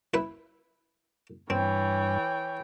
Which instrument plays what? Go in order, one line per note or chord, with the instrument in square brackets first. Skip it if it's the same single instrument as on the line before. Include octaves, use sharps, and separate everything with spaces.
[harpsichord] E4 B4
[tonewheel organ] G2 [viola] E3 G5 [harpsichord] C4 [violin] C#5